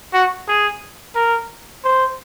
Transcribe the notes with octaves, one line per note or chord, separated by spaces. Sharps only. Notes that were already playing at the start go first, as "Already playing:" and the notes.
F#4
G#4
A#4
C5